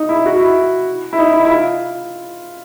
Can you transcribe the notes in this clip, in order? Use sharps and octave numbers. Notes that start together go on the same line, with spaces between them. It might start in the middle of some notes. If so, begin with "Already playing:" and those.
Already playing: D#4
E4
F#4
E4
E4
D#4
E4
E4
F4